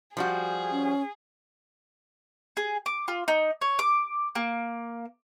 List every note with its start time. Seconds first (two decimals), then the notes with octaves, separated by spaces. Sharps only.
0.17 F3 G3 F#4 G#4
0.72 C#4
2.57 G#4
2.86 D6
3.08 F4
3.28 D#4
3.61 C#5
3.79 D6
4.35 A#3